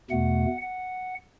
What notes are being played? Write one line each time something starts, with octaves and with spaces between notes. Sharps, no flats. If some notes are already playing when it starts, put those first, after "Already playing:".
E2 B2 A3 F#5
F#5